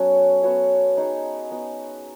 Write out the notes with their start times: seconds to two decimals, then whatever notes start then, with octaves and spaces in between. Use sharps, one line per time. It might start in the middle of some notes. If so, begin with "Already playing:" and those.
Already playing: F#3 B3 C#4 F#4 A4
0.43 B3 F#4 C#5 E5
0.97 D#4 G#4 C#5
1.51 B3 D#4 F#4